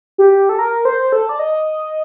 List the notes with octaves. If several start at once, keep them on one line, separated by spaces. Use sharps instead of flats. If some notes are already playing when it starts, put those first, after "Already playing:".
G4
A4
A#4
C5
A4
D5
D#5